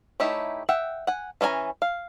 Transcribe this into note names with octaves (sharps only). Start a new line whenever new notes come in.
A3 D#4 E4 G4 C#5
E5 F#5 G5
F#5 G#5
E3 C#4 D#4 G#5 A#5
F5